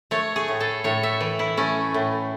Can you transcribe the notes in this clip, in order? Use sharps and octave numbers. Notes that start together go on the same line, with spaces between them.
A3 C#5
G#4
A2
A4
A2 C#5
E5
E3
E4
A3 C#4
A2